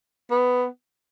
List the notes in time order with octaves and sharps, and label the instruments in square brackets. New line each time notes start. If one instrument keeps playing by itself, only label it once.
[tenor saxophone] B3